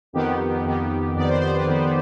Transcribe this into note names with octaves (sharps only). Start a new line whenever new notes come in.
F2 D#3 B3 G4
F2 D#3 B3
F2 D#3 B3 D5
C5
C5
B4
F2 D#3 B3